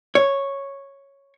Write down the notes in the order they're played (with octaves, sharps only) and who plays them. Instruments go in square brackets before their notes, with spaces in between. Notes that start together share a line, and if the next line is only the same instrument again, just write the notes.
[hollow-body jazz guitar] C#5